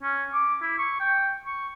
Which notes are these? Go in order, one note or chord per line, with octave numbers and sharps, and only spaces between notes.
C#4
D6
E4
C#6
G5
C#6